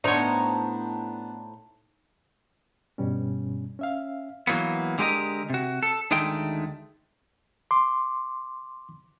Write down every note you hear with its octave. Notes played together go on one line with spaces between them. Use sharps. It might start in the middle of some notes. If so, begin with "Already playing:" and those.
A2 B3 D4 D#4 C5 C#5 A#5
G2 B2 G3 C#4
C#4 E5 F5
E3 F#3 A#3 B3
D3 G#3 G4 A#4 D#5
C3 F#4
A4
D2 D#3 G#3 A3 G5
C6 D6